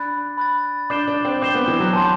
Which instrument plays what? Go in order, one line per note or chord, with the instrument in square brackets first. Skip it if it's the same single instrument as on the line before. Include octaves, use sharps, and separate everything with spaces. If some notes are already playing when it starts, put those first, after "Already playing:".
Already playing: [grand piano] D4 [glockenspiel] B5 F#6 A6
[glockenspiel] B5 F#6 A6
[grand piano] D4 [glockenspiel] D6 G6 C7 E7 G7
[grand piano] D4
C4
[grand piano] C4 [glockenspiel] D6 G6 C7 E7 G7
[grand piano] B3
E3
F#3
[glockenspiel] A5 C6 G6